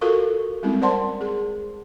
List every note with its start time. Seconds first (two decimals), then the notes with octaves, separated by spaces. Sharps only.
0.01 F4 F#4 A4 A#4 F5 C#6
0.63 G3 G#3 A#3 C4 C#4 E4
0.81 A#4 C5 D5 F#5 A5 C6
1.21 G#4